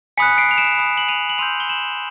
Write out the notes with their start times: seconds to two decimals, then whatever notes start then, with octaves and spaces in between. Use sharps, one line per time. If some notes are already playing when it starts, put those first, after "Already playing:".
0.17 G#5 B5 D#6 F#6 B6 C#7
0.38 C7 D7
0.51 F7
0.58 D7 E7
0.78 B5 D#6 F#6
0.98 F#7
1.08 D#7 F7
1.30 F#7
1.38 C6 E6 G6 D#7 F7
1.60 G7
1.69 E7 F#7